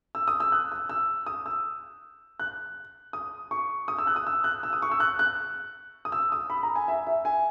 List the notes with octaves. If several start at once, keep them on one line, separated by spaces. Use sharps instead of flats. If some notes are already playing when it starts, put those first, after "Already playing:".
E6
D#6
E6
F#6
E6
E6
D#6
E6
F#6
D#6
C#6
D#6
E6
F#6
D#6
E6
F#6
E6
D#6
C#6
E6
F#6
F#6
D#6
E6
D#6
B5
A#5
G#5
E5
E5
G#5